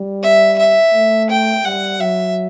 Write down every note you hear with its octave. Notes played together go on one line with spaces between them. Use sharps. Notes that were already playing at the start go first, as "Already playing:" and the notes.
Already playing: G3
E5
E5
A3
G5
G3 F#5
F#3 E5